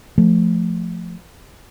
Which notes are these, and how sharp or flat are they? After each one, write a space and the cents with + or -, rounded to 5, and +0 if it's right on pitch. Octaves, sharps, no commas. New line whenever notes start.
F3 +0 A3 +0